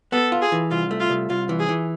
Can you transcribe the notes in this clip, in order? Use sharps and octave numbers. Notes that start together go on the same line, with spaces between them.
B3 A4
F4
G#4
E3
C2 F4
A3
F4
C2
C2 F4
E3
G#4
E3